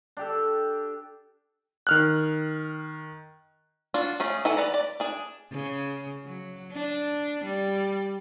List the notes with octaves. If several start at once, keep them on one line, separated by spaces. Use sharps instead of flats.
D4 G4 A4
D#3 F6 F#6
D4 F4 F#4
A3 C#4 G#4
E3 A4 F#5 G#5
B4 D5 A#5
D5
D4 G#4
C#3
F#3
D4
G3